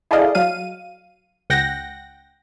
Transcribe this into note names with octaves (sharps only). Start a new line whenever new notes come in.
E4 G#4 A4 D5 D#5 F5
F#3 F5 D#7
C#2 F#5 G5 A#6